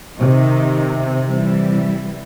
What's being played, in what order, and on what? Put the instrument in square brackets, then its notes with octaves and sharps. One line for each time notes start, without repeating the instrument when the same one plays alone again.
[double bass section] C3 [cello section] D#3 D#4
[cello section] E3 G3 E4